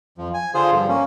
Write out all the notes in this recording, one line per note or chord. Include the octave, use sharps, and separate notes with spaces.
F2 F3
G#5
D3 F4 G#4 C5
G2 D3 F3
A#3 C#4